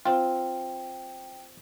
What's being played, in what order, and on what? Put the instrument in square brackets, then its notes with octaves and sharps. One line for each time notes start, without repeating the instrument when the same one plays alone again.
[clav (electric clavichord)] C4 F4 [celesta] G5